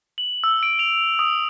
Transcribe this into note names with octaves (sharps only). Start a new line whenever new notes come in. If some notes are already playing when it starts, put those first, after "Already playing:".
F#7
E6
D7
F7
D#6